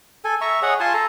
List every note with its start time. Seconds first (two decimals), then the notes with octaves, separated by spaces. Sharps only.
0.25 A4 G#5
0.41 E5 A#5 C#6
0.63 G#4 C#5 D#5 F#5
0.80 F4 G#5 A5 C6
0.94 A4 A#5